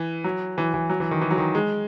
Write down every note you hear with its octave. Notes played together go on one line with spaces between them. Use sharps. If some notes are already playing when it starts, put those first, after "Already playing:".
Already playing: E3
F#3
E3
E3
F#3
E3
D#3
E3
F#3
D#3
G#3